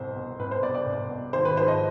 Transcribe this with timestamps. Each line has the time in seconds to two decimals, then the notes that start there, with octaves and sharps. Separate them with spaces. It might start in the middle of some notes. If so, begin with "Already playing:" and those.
Already playing: C2 B2 C5
0.16 B2
0.39 C2 B4
0.51 C5
0.63 B2 D5
0.75 D5
0.86 C2
1.10 B2
1.33 G#1 C5
1.45 B4
1.57 G#2 F3 C5
1.68 D#5